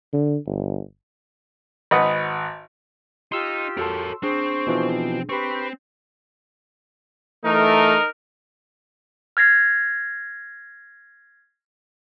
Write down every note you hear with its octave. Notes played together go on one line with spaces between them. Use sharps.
D3
G1
G#1 B4 D#5 F#5
D#4 F4 G4 C6 E6
F#4 A4 A#4 C#5 A5
C4 D4 G#4 C5 C#6
B2 E3 F3
C4 G4 B4 C6 C#6
E3 A3 D#4 A#4
F6 G#6 A#6 C7